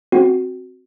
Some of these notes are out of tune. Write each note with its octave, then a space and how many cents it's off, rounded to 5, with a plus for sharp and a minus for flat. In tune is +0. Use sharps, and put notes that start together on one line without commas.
C4 +0 F#4 +0